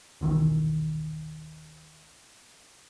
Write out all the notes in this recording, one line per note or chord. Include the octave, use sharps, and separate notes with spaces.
D#1 B1 D#3 E3